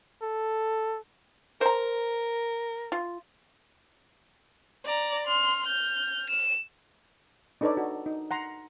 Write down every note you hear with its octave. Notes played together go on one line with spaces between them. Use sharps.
A4
A#4 C5 A#5
F4
D5 A#5
C6 F6
F6 G6
E7
D4 D#4 A4 B4 C#5 D5
F#4
D#4
F#5 A#5 C6